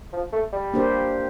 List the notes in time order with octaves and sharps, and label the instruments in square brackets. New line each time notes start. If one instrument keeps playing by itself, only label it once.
[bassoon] F3
A3
G3
[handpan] A#3 D4 G4 C5